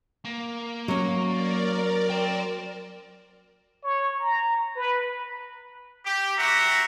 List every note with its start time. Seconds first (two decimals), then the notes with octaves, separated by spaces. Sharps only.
0.25 A#3
0.88 F#3 C#4
1.22 A#4 D5
2.10 G5 C6
3.84 C#5
4.19 A#5
4.76 B4
6.06 G4
6.38 C4 F#4 G4 E5 F#5 A#5